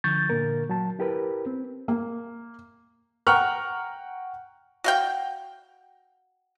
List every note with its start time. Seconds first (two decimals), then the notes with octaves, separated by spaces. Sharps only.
0.04 D3 F3 C#6 G6 A6
0.30 A#2 D3 A#3 A#4
0.69 F#3 A5
0.99 E4 G4 A#4 B4
1.46 C4
1.88 A#3
3.27 F#5 G5 A#5 C#6 F6 F#6
4.84 F#4 F5 G5